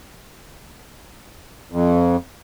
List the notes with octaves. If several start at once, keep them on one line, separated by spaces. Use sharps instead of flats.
F2